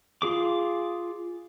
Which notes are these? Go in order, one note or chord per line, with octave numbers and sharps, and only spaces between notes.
F4 G#4 D6